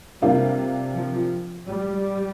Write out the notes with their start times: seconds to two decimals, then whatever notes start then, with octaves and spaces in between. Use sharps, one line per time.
0.21 C3 G3 A#3 D4 F4
0.94 F3
1.66 G3